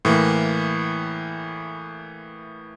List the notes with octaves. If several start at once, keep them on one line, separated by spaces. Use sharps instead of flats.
A2 E3 A#3